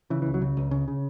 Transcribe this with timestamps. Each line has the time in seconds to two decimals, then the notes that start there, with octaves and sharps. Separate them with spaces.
0.10 C#3 E3
0.22 E3
0.26 C#2
0.34 F#3
0.42 C#3
0.57 C#2
0.71 C#3
0.88 C#3